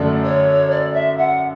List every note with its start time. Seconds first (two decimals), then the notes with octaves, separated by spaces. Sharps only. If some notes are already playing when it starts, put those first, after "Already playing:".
Already playing: F#2 D3 A3 D4 A4 D5
0.23 C#5
0.71 D5
0.94 E5
1.17 F#5